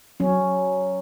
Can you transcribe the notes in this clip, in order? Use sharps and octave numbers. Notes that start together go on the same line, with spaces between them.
F#3 C#4